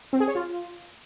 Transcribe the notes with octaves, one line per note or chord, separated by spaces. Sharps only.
C4
G#4
C#5
F4